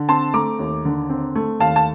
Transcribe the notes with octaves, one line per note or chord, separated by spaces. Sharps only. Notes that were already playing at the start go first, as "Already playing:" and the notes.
Already playing: D3
C4 A5 C6
A3 A#5 D6
D#2
D3
C4
A3
D#2 F5 A5
A5